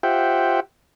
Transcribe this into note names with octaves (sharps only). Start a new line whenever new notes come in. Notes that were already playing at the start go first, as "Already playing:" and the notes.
F4 G4 C5 E5 F#5 G5